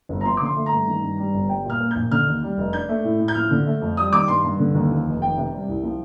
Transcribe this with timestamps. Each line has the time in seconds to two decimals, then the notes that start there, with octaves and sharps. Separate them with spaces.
0.09 G1
0.21 A#5
0.25 F3 C6
0.37 D6
0.41 D3 C6
0.56 A3
0.66 A#5
0.72 G2
0.87 D#3
1.03 G2
1.18 G3
1.34 G1
1.49 G3 G5
1.65 A#2 F6
1.80 A#3
1.91 A#1 G6
2.11 D3 F6
2.27 D#2
2.42 G3
2.58 F1
2.73 D4 G6
2.89 A3
3.04 A2
3.20 A2
3.28 G6
3.35 F3 F6
3.51 D3
3.66 A3
3.81 F2
3.97 G3 D#6
4.13 D#3 D6
4.28 G2 C6
4.44 G2
4.59 D3
4.75 D#2
4.91 F3
5.06 F1
5.22 D#3 G5
5.37 C3
5.53 G3
5.68 C2
5.83 F3